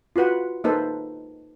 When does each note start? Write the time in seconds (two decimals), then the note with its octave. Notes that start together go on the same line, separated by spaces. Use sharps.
0.16 F4 F#4 B4 F#5
0.64 A#3 D#4 A4 B4 C5